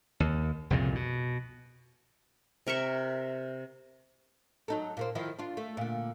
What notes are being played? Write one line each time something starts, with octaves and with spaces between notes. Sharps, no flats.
D#2
C2 F2 A#2 C#3
B2
C3 A#4 E5 C#6
F#3 D#4 A4
A#2 A#3 C4
D#3 F3 E4
D4 F4
A3
A#2 D3